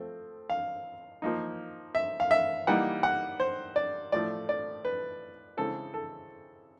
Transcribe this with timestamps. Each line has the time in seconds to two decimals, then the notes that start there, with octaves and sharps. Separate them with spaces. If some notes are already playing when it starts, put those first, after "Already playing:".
Already playing: F3 A3 C4
0.50 F5
1.22 F3 A#3 D#4
1.95 E5
2.20 F5
2.31 E5
2.67 E3 G3 A#3 D#4 F#5
3.03 F#5
3.40 C5
3.76 D5
4.12 A2 F3 A3 D5
4.49 D5
4.85 B4
5.57 C#3 E3 G#3 C4 A4
5.94 A4